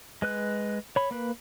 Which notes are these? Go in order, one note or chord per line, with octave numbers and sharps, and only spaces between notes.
G#3 B4 F#6
C#5 B5
A#3 B4